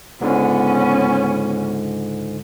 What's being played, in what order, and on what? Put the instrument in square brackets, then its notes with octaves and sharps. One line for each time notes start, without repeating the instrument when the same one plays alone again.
[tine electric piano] C#2 G#2 D3 [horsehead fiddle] B3 C#4